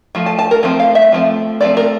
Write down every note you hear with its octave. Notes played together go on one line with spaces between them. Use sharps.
F3 A3
A5
A5
A#4
F3 A3 C4 A#4
F5
E5
F3 A3 C4
F3 A3 C4 D5
A#4